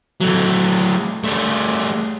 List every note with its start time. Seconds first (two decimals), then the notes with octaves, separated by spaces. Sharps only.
0.21 F#3 A3
1.24 G3 A3